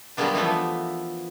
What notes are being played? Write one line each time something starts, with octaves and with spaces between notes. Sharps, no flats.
D3 F#3 G3 A#3 B3 D4
E3 F3 A3 B3